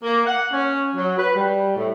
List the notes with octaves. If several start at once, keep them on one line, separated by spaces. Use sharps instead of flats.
A#3
F#5
C#4
F#3
B4
G3
A2